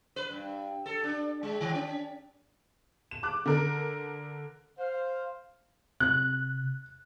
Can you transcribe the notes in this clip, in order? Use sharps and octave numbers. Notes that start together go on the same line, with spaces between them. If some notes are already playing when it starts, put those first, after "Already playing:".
B4
G2
A4
D4
G#3
D#3
C#4
E7
D6 F#6
D3 A#4
C5 F5
C3 F#6